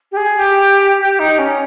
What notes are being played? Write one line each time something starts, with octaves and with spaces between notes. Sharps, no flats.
G4
G#4
G4
G4
D#4
C#4